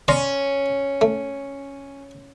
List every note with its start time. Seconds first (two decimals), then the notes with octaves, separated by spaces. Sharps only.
0.08 C#4 D5 A#5 C6
1.01 A3